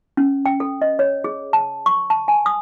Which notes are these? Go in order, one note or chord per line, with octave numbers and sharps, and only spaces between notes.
C#4
G5
A4
D#5
C#5
G#4
A5
C#6
A5
G#5
D#6